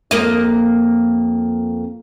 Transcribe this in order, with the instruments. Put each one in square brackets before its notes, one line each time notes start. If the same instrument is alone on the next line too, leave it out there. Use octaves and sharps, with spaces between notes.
[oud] F2 A#3 D#5